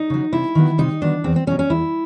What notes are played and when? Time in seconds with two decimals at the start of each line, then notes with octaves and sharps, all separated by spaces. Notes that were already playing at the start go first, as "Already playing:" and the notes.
Already playing: D#4
0.10 C#3 F#3
0.33 C3 E4
0.55 D#3 F#3 B3
0.78 C3 D#4
1.01 D#3 F#3 B3 D4
1.24 E2 C4
1.36 C4
1.47 B2 C#4
1.51 F#3
1.59 C#4
1.70 E2 E4